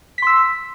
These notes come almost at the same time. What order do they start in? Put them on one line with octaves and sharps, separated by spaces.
B6 C6 E6